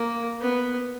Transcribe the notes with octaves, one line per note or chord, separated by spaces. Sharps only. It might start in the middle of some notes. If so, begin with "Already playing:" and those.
Already playing: A#3
B3